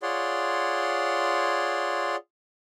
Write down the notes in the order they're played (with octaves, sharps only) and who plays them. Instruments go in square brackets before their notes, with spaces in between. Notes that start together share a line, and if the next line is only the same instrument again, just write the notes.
[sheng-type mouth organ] F4 G#4 C#5 D5 F#5 C6